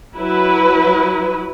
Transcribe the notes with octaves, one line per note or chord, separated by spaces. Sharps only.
F#3 E4 B4